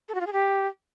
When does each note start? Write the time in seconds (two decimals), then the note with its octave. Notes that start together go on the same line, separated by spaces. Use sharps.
0.08 A4
0.14 F#4
0.21 F4
0.27 G#4
0.33 G4